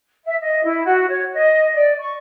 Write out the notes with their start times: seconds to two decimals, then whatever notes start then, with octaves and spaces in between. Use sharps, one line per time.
0.25 E5
0.41 D#5
0.64 E4
0.85 F#4
1.08 C#5
1.33 D#5
1.74 D5
2.00 C#6